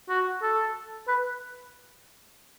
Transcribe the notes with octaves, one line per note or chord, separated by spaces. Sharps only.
F#4
A4
B4